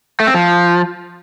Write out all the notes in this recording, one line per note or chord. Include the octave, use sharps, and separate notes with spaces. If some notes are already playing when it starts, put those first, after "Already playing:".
A3
C4
F3